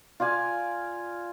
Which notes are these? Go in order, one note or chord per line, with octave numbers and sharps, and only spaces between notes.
F4 D5 F5 G#5